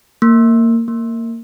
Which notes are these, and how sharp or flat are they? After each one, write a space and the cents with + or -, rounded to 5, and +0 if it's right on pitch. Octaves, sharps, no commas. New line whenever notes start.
A#3 -25
A#3 -25